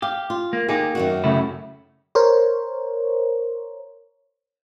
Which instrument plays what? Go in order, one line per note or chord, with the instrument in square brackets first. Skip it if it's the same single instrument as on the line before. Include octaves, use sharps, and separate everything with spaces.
[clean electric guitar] G4 [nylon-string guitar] F5
[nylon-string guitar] F4
[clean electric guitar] A#3
[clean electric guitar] A#3 D#4 G4 [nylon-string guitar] G#4
[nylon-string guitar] F#2 D#3 F#4
[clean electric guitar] C#3 A3 E4
[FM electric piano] A#4 C5 C#5